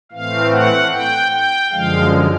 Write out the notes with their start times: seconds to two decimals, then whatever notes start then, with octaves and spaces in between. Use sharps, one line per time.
0.12 A2 E3 A3 C4 F5
0.52 F#5
0.92 G5
1.32 G5
1.72 F#2 D3 F3 G#3 F5